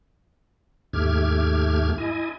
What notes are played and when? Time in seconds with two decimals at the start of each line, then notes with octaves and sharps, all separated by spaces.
0.93 D#2 G#2 A3 G4 F6 G#6
1.98 E4 D#5 G#5